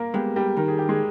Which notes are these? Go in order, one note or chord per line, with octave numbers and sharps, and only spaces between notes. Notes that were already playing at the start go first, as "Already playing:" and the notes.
Already playing: A#3 A#4
G3 G#3 B3 G4
G3 G4
D#3 A#4
G#4
G4
G#3 G#4